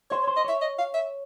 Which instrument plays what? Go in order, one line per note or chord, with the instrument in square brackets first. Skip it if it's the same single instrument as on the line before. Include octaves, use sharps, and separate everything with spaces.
[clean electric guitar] C5 [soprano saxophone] C#5
[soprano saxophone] C#5
[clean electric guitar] C5
[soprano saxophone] D#5
[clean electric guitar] C#5 [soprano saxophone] E5
[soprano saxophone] D#5
F5
E5